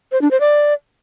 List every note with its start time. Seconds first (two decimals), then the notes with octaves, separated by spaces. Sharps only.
0.12 C5
0.22 D4
0.31 C5
0.40 D5